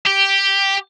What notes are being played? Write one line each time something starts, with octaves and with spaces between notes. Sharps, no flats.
G4